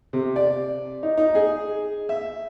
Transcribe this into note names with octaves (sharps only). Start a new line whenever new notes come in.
C3
D5
D#4
D#4
G#4
E5